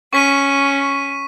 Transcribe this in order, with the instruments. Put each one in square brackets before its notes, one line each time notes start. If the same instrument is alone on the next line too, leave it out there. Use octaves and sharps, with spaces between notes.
[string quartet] C#4 [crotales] C#6 B6 D#7